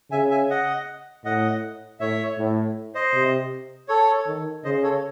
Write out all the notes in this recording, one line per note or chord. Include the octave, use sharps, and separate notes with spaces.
C#3 E5 G#5
E5 G#5
D#5 F#5
A2 D#5 F#5
A2 C#5 E5
A2
C5 D#5
C3
A4 C#5
D#3
C#3 C5 D#5
A4 C#5